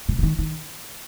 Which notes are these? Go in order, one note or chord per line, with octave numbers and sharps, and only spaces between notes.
C3
C#3
D#3
D#3